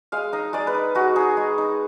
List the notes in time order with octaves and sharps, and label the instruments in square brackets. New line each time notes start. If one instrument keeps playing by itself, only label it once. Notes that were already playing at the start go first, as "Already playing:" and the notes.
[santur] G#3 F5
D#4 D#5
G#3 D5
B4
D#4
G#3 F#4
D#4 G#4
G#3
D#4